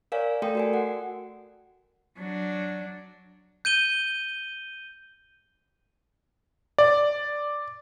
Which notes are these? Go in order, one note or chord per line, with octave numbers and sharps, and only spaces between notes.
A#4 C#5 D5 F5 G#5
A3 A4 D5 G5 C6
F#4 A#4 G#5
F#4 F#5
F#3 D4
G6 D#7 G7
D5